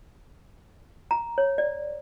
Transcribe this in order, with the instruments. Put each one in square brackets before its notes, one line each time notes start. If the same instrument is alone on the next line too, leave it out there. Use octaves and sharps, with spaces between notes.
[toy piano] A#5
C#5
D5